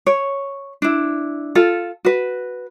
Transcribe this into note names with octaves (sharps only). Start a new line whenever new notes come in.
C#5
D4 E4
F4 A4
F#4 B4